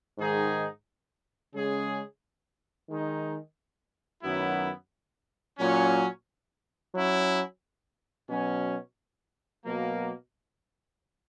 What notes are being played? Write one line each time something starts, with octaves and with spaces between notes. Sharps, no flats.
G#2 D#3 G#3 D#4 G#4
C#3 G#3 C#4 G#4
D#3 G#3 D#4
F#2 D#3 F#3 B3 E4
A#2 F#3 C#4
F#3 C#4 E4
B2 F#3 C#4
B2 F#3 A#3